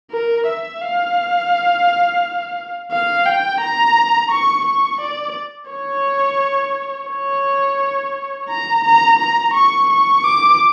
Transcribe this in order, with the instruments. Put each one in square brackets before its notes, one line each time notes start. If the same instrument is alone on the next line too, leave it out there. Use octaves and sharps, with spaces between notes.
[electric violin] A#4
E5
F5
F5
G5
A#5
C#6
C#6
D5
C#5
C#5
A#5
A#5
A#5
C#6
C#6
D6